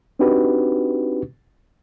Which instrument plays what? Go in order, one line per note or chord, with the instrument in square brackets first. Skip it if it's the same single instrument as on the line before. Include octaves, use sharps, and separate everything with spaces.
[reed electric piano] C4 D4 D#4 F#4 G4 B4